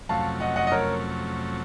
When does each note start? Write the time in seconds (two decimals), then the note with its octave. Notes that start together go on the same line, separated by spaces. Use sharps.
0.09 F2 C3 F#3 A3 C#4 F5 A5
0.40 D#5 F#5
0.56 D#5 F#5
0.67 D#5
0.72 A#4 C#5